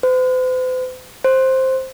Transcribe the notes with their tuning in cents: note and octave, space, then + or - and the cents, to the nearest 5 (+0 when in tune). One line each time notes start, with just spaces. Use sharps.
C5 -45
C5 +5